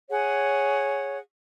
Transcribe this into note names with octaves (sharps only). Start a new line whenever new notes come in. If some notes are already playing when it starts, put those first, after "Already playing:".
G#4 C#5 F#5